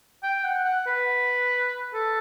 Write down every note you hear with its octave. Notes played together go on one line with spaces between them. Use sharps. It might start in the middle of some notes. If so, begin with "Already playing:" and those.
G5
F#5
F#5
B4
A4